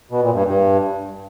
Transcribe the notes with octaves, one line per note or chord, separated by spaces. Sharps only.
B2
A#2
G2
G2